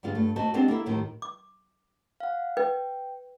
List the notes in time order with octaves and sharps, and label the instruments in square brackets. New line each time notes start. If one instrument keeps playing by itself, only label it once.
[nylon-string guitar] G2 D3 G#3 F4
G2 A3
A3 F#4 C5 D#5 A5
G#3 B3 C4 D4 F4 G4
A#3 E4 A4 E5
D#2 A2 D#3 F3
[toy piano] D6
[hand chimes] F5 F#5
[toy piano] B4 [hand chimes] G5